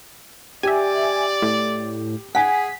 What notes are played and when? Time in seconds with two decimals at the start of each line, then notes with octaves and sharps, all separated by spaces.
0.63 G4 D5 E5 G#5
1.42 A2
2.35 G#4 F#5 G#5 B6